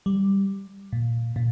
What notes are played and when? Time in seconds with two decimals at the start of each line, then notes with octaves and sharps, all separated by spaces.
0.06 G3
0.93 A#2
1.36 A#2